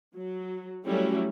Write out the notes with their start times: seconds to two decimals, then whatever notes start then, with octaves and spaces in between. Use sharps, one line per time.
0.16 F#3
0.85 F#3 G3 A3 C#4 E4 F#4